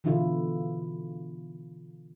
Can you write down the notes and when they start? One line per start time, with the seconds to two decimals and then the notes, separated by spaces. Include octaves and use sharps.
0.04 B2 D3 E3 E4 F4 A4